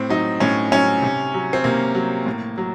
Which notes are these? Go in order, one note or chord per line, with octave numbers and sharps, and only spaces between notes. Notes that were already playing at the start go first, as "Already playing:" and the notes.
Already playing: A2 C4
F#3 D#4
A2 C#4
F#3 C#4
C3
F#3
C4
C3 A#3
F#3
A2
F#3